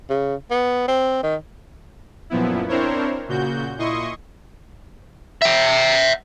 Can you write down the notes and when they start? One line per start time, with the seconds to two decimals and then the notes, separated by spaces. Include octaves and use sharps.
0.10 C#3
0.51 B3
0.88 C4
1.23 D#3
2.30 F#2 A#2 F3 B3 E4
2.69 C4 D4 E4 A#4 C5 C#5
3.28 A#2 C#3 F#4 G6
3.78 A#2 E4 D#5 C6 C#6 D#6
5.42 E5 G5